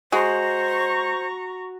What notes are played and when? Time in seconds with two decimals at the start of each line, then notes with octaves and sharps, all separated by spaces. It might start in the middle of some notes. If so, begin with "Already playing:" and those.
0.12 G#3 F#4 C5 A#5 C#6